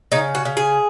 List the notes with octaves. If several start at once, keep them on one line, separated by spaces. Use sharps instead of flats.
C#3 D#4
F#4
C#3
G#4